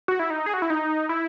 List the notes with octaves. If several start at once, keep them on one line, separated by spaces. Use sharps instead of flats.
F#4
E4
D#4
G#4
F#4
E4
D#4
E4